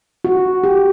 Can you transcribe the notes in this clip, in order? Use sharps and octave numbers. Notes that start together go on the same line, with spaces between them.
F#4
G4